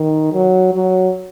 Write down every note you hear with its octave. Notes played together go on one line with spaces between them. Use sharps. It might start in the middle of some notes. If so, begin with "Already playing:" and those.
Already playing: D#3
F#3
F#3